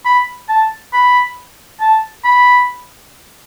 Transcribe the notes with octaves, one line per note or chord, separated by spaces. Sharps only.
B5
A5
B5
A5
B5